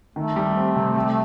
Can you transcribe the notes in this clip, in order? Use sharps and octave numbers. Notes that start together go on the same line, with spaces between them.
D#3 A3
G3
C4
C3
G3